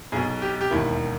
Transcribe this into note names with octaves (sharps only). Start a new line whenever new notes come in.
B1 B2 G#4
G4
G4
E1 D#2 D#3 E4